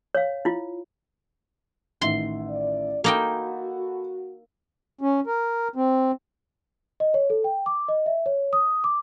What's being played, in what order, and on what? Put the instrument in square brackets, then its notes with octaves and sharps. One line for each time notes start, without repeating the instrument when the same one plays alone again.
[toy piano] C#5 F5
E4 F4
[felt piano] A1 D#3 E5 [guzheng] C6
[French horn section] D5
[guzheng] A#3 D#4 G5 [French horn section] F#4 [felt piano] A4 B5
[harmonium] C#4
A#4
C4
[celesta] D#5
C#5
A4
G5
D6
D#5
E5
C#5
D#6
D6